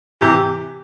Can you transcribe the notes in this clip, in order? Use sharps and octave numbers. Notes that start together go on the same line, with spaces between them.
C3 E3 G4